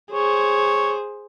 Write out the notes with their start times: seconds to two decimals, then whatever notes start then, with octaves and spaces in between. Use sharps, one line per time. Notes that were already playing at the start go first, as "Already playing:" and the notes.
0.12 G#4 C5 C#5